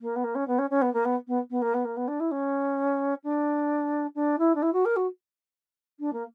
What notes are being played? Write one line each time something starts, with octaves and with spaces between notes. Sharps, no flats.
A#3
B3
A#3
C#4
B3
C#4
C#4
B3
A#3
B3
B3
B3
A#3
B3
A#3
B3
D4
E4
C#4
D4
D4
E4
D4
E4
F#4
A#4
F#4
D4
A#3